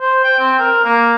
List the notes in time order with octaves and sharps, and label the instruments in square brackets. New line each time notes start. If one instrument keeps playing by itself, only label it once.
[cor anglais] C5
G5
C4
A#4
A#3